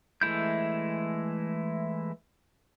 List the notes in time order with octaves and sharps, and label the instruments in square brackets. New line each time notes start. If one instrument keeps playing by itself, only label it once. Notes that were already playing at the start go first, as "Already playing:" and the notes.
[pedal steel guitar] E3 G#3 A3 E4 G6